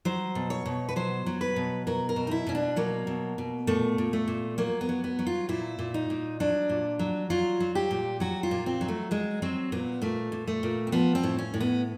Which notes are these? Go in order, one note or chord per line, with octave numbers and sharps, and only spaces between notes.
F#3 C5
B2
C#5
B2
B4
F#3 C5
F#3
B4
B2
F#3 A#4
A#4
B2
D#4
E4
B2 C#4
D4
F#3 A#3
B2
B2
A#2 A3
A#2
A3
A#2
F#3 A#3
B3
F#3
B3
F#3
F4
A#2 E4
A#2
D#4
A#2
F#3 D4
A#2
F#3
F#3 F4
F#3
G4
A#2
F#3 F#4
F4
A#2
C4
F#3
A3
F#3 G#3
F#3 C4
A#2 B3
A#2 A3
A#2
A3
A#2
C4
F3 B3
C4
A2
C#4
A2
B3